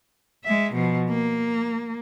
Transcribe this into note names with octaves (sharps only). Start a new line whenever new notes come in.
G#3 E5
B2 F3
A#3